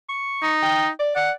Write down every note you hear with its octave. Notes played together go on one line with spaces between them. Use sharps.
C#6
D#4
G5
D5
D5 F#5